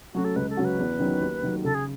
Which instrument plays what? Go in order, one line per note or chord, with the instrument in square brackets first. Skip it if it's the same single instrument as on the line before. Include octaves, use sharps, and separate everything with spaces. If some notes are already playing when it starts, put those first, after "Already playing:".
[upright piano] F#3 A3 C#4 [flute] F#4
[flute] A4
[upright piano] C#2 [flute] B4
[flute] A4
[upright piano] C#3 F#3 C#4 F#4
[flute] B4
[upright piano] E2
D#3 F#3 C#4
D#2
D#3 F#3 A3
[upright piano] C#3 [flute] A4
[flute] G#4